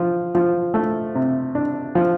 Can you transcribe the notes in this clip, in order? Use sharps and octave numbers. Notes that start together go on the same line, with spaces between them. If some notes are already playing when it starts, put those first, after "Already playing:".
Already playing: F3
F3
A3
C3
D4
F3